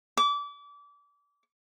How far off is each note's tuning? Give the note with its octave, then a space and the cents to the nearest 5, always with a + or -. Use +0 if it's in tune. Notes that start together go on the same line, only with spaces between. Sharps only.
D6 -30